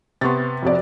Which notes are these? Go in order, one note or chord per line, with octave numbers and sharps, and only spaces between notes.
C3 B3 C6 C#6 A6
F2 F#4 D5